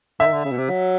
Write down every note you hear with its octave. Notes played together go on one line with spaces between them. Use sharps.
D3 E5
D#3
D3
C#3
B2
C3
F#3